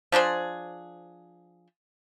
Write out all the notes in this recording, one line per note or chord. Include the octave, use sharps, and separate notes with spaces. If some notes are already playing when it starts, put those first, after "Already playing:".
F3 D4 G#4 C5